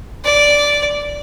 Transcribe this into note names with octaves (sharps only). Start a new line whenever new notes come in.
D5